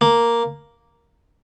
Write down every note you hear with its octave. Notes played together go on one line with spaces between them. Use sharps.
A#3